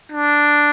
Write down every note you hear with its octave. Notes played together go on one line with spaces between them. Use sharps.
D4